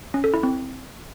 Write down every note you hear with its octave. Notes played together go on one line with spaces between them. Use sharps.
C#4
A4
E4
C4